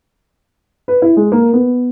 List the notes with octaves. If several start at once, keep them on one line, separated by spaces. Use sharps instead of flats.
B4
E4
G#3
A#3
B3